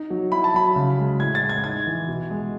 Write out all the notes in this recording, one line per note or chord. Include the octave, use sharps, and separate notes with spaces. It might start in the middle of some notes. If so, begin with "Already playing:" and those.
Already playing: D#4
F#3
E4 B5
A5
F#3 B5
C#3
G#3
A2 G#6
A6
G#3
G#6
D#4 G#6
E3
B2
G#3